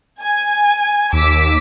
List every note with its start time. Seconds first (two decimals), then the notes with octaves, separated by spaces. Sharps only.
0.21 G#5
1.13 D#2 D6 E6 B6